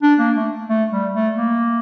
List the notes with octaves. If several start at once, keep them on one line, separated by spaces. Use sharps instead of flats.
D4
A#3
A3
A3
G3
A3
A#3